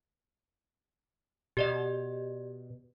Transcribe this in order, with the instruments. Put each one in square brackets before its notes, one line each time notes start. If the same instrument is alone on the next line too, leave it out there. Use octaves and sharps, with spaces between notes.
[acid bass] B2 [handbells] G4 D5 D#5